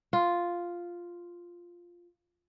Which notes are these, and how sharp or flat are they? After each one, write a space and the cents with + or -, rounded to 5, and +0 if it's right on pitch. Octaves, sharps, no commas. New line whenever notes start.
F4 +0